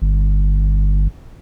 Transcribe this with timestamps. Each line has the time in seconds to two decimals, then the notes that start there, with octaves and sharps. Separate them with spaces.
0.02 G1